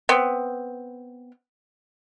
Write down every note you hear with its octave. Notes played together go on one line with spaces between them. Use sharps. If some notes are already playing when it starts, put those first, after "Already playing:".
B3 C4